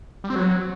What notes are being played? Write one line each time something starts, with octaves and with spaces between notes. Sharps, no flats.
G3
C4
F#3